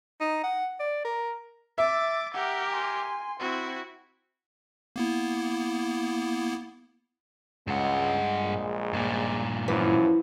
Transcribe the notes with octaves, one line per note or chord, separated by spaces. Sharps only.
D#4
F#5
D5
A#4
E5 D6 A6
G4 A#4 F#5
G#5 C6
C4 E4 F#4
A#3 B3 E4
C#2 G2 G#3 F#5
A#1
G2 A#2
F#2 E3 F3